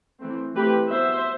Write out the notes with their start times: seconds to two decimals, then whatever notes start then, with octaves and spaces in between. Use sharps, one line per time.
0.21 E3 A3 C4
0.56 E3 A3 C4 G4 B4
0.91 F#3 B3 C5 E5